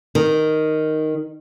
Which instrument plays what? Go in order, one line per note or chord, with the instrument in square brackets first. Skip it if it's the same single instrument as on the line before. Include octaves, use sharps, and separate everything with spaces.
[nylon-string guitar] D#3